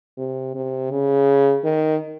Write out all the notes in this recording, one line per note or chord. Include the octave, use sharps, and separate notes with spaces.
C3
C3
C#3
D#3